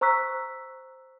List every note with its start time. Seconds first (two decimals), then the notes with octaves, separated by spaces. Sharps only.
0.01 C5 A#5 C#6 E6 F#6 B6